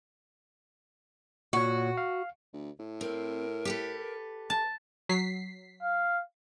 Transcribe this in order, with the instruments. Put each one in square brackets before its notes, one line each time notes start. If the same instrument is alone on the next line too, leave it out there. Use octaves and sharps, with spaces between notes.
[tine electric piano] A#2 C#5 [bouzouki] F#4
[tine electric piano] F5
[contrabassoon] D2
A2
[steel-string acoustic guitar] C4 [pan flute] A#4
[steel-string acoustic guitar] G4 A4 B4
[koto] A5
[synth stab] F#3 B6 C7
[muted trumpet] F5